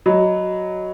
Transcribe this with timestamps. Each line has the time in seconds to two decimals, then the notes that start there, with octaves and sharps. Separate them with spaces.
0.06 F#3 F#4 D#5 B5